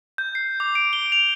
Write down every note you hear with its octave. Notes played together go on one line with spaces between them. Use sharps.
G6
C7
D6
D7
G7
F7